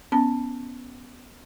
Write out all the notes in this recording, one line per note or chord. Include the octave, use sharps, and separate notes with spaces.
B3 C#4 A5